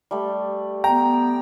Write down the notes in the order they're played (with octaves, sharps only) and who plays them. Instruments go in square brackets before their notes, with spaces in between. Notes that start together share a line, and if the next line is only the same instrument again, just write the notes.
[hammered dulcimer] G3 A3
[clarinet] B3 [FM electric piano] G5 [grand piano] A#5